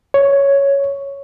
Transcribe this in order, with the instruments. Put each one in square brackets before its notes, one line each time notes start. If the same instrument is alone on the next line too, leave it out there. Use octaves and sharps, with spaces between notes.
[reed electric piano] C#5